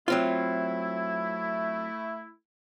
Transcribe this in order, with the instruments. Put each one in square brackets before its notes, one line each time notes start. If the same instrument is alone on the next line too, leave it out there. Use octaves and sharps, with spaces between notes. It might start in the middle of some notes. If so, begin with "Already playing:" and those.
[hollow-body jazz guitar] F#3 C4 F4 [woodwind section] A3 E4